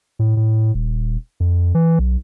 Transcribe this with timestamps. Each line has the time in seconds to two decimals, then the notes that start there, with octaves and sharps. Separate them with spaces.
0.19 A2
0.37 A2
0.74 D#1
1.40 F2
1.75 E3
1.99 B1